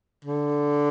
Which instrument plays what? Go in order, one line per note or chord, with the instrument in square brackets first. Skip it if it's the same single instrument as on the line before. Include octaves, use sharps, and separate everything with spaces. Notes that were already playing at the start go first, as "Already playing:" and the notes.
[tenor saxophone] D3